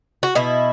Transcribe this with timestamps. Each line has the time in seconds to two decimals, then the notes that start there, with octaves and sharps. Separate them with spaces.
0.23 F#4
0.35 B2 E4